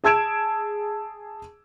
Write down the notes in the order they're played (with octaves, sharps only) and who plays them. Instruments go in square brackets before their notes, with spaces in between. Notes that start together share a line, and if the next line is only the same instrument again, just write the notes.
[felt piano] G#4 A5 E6 G#6 D7 E7